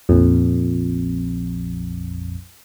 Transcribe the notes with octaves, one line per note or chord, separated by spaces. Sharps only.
A#1 F2